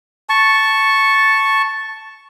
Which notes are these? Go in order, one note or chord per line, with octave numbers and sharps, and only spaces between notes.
A5 C#6